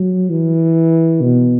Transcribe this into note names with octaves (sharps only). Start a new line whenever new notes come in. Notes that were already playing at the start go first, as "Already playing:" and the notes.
Already playing: F#3
E3
B2